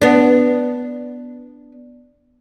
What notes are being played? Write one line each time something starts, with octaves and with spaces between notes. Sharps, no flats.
B3 D4